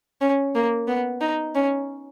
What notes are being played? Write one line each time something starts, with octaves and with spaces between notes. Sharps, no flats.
C#4
A#3
B3
D#4
C#4